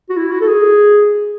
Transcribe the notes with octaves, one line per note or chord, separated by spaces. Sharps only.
F#4
E4
F#4
A4
G#4